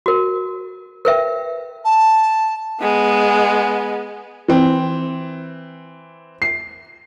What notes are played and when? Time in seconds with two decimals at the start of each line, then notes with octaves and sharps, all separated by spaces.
0.06 F#4 A#4
1.05 A#4 B4 E5 G5
1.84 A5
2.81 G#3 B3
4.48 E3 C4
6.42 C7